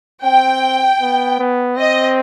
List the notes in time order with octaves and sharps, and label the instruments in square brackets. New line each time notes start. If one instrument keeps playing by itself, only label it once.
[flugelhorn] C4 [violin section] G5
[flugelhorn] B3
B3
[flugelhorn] C4 [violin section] D#5